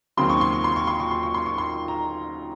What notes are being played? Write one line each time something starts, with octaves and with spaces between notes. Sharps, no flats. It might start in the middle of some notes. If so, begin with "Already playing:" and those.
D#2 C#3 F#3 C4 C6
C#6
C6
C#6
C6
C#6
C6
C#6
C6
C#6
C6
C#6
C6
A#5